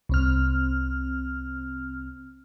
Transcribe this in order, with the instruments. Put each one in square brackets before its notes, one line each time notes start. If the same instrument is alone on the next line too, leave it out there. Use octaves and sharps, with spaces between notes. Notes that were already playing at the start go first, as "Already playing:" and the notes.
[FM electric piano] C2 C4 F6